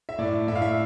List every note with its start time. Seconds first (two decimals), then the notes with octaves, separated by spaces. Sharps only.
0.09 E5
0.18 A2 D5
0.47 A2 E5
0.55 F5
0.62 E5